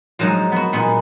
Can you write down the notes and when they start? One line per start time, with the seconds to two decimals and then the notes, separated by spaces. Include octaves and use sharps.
0.19 F3 F#3 G#3 D#4
0.52 B3 F#4
0.73 A#2 B3 D#4